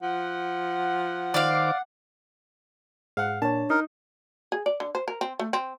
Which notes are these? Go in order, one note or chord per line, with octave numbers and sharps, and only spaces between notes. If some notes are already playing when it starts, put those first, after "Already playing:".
F3 F#5
D#3 C5 D5 F5 D6
G#2 F5 F#5
A#2 D4 C#5 A5
D#4 A#4
G#4
D5
D3
C5
A#4
C4
A3
C4